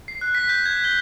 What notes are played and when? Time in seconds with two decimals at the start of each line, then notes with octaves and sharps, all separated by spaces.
0.08 C7
0.21 F#6
0.35 B6
0.49 G6
0.66 G#6
0.84 G7